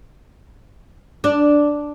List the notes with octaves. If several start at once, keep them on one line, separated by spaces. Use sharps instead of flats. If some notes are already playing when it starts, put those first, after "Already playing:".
D4